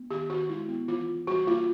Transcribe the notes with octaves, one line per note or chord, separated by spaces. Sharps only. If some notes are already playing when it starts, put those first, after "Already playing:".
Already playing: B3
D#3 G4
D#3 F#4
G#3 E4
B3
E3 F4
E3
G3 F#4
A#3 F4